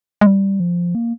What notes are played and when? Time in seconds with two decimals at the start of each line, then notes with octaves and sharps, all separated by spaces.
0.21 G#3
0.27 G3
0.60 F3
0.95 A#3